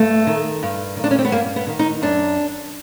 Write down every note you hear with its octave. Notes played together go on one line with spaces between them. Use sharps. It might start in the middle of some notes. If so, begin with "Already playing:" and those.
Already playing: G2 A3
D#3
G2
D#3
D4
C#4
C4
B3
G2 A#3
B3
D#3
D#4
F#2 D4